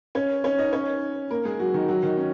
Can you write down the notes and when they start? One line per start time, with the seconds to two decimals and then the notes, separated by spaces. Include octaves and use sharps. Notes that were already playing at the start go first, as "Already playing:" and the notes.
0.15 C#4 C#5
0.44 C#4 C#5
0.58 D#4 D#5
0.73 C#4 C#5
1.31 A#3 A#4
1.45 G#3 G#4
1.59 F#3 F#4
1.74 D#3 D#4
1.88 F#3 F#4
2.03 D#3 D#4
2.17 C#4